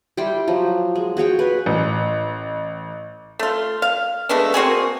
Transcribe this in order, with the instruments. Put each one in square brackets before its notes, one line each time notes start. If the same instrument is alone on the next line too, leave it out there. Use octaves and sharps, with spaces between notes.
[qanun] G3 E4 G5 C6
F3 F#3
G#3
F#4 G#4 C#5 G5
B4 G#5
[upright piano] A1
[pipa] A3 F4
F5
G#3 A3 B3 D4
A#3 C4 F#4 G#4